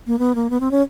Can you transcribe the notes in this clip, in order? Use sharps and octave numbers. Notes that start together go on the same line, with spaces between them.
A#3
B3
A#3
B3
C4
C#4